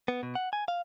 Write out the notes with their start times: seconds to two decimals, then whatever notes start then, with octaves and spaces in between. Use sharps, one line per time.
0.08 B3
0.23 B2
0.35 F#5
0.53 G#5
0.68 F5